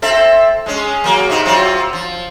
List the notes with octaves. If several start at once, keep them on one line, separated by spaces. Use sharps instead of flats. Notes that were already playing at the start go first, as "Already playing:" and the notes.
C4 A4 E5
G#3 C#4
F#3 A#3
C3 D#4
F#3 C4 F4
F3